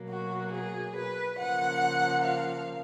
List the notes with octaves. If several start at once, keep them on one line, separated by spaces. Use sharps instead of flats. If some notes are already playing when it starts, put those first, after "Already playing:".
Already playing: B2 F#3 A#3
F#4
G#4
B4
C#3 F3 A#3 F#5
F5